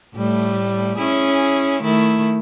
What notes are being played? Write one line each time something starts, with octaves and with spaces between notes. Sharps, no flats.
A2 G3 A3
C#4 E4 G#4
D#3 A3 E4